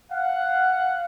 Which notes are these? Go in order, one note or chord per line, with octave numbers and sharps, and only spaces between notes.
F5 F#5